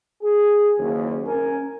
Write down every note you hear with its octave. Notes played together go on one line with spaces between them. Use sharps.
G#4
F#1 D#2
C#4 A#4 G#5